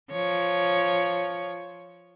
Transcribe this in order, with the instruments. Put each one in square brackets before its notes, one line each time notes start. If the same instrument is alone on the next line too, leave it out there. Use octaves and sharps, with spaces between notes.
[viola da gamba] F3 C#5